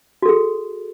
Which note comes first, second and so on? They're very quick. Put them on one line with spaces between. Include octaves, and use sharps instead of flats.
F#4 A4 G#4